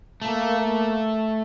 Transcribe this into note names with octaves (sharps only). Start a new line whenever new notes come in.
A3 A#3
A#3